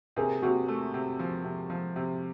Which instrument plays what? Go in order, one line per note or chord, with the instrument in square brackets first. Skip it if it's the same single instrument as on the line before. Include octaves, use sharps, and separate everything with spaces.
[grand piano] C3 [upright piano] G#4 A#4
[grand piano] C3 [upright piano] F#4 G#4
[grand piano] A3
C3
F3
C3
F3
C3